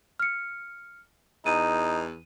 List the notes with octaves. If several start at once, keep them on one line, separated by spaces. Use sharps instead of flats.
F6 C#7
E2 D#4 D#7